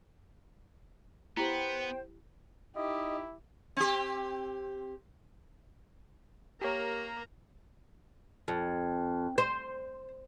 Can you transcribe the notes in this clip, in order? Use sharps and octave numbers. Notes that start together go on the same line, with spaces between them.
B3 E4 G4 C5 G5
D#4 E4 G4 D#5
C4 G4
A#3 G4 A#4 C#5 A#5
F2
C5